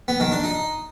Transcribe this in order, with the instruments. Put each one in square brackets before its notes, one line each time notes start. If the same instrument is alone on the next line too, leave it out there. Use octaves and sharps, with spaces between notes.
[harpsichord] B3
D#3
D4
D#4